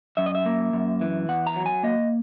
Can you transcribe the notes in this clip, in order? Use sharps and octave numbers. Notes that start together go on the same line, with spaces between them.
F#2 E5
D#5
E5
A#3
F#2
E3
E2 F#5
A#5
F#3
G#5
A#3 D#5